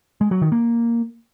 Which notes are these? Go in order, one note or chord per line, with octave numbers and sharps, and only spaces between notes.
G#3
F#3
D#3
A#3